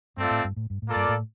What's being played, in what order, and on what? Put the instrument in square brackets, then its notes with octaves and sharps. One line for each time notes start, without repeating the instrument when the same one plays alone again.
[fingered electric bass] G2 [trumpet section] A3 C4 F4 A4 D5
[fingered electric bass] A2
G2
A2
G2
A2
[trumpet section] A#3 F4 A4 D5
[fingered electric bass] G2
A2